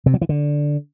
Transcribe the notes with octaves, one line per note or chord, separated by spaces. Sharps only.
C3
F#3
E3
D3